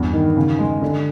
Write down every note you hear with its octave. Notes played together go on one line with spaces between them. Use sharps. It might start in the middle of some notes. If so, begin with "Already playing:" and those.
Already playing: E2 G2 G3
D#3
C#3
G#3
D3